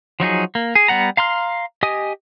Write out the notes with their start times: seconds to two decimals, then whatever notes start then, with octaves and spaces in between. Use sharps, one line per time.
0.20 F3 F#3 D#4 G#4
0.55 A#3
0.75 G#4
0.88 G3 B3 F#5 A#5
1.17 F5 A#5 C6 F6
1.83 G4 D#5 G#5 D#6